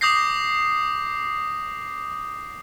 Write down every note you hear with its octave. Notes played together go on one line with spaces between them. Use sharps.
D6 D#6 G6 A#6 C7